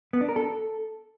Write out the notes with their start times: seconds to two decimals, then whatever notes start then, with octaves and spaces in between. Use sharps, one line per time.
0.13 B3
0.21 D4
0.29 A#4
0.36 A4